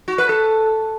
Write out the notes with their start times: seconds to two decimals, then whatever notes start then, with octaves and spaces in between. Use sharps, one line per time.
0.08 F#4
0.18 B4
0.29 A4